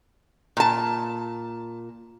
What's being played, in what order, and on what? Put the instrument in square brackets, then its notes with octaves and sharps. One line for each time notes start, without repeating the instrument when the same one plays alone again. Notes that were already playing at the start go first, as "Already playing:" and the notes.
[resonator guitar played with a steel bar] A#2 A5